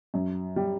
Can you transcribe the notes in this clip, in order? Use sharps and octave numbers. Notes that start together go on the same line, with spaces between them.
F#2
G3